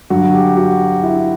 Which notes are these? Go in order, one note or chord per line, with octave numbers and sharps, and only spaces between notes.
G2 D3 F#3 F#4
G4
F#4
E4